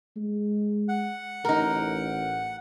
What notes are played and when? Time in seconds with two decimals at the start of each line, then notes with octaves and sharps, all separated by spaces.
0.16 G#3
0.89 F#5
1.45 A1 D#4 A#4